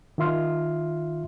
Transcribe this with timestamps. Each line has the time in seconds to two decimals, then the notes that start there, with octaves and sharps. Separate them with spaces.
0.18 D#3 F4 E5 C6 F6